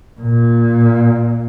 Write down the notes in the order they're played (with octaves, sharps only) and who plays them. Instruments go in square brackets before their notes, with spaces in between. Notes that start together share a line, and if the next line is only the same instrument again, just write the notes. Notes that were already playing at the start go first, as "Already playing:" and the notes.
[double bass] A#2